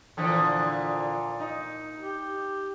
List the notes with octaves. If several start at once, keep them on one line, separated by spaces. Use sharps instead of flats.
A#2 D3 E3 F3
D#4
G4